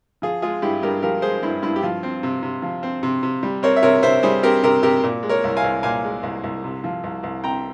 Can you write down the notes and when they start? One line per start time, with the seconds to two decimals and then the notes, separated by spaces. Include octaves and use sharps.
0.22 F3 F4 G#4
0.42 G#3 F4 G#4
0.62 G2 E4 G4
0.82 G2 G4 A#4
1.02 F3 G4 A#4
1.22 G#3 G#4 C5
1.43 G2 E4
1.62 G2 E4
1.76 G4
1.82 F3 F4
2.03 C4
2.23 C3
2.43 C3
2.62 F3
2.83 C4
3.03 C3
3.23 C3
3.43 G3
3.63 C4 A#4 C#5
3.76 E5
3.83 C3 A#4 C#5
4.03 C3 C5 E5
4.23 G3 G#4 C5
4.43 C4 G4 A#4
4.63 C3 G4 A#4
4.83 C3 G4 A#4
5.03 A#2
5.23 G#3
5.29 A#4 C#5
5.44 C2
5.57 F5 G#5
5.64 C2
5.83 A#2 F5 G#5
6.04 G#3
6.23 C2
6.43 C2
6.64 C3
6.84 F3
7.03 C2
7.23 C2
7.44 C3 G5 A#5